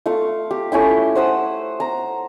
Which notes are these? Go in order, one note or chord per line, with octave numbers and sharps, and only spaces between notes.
A3 F4 F5 C#6
G4
A3 C#4 E4 G5
C5 F#5 D#6 E6
A#5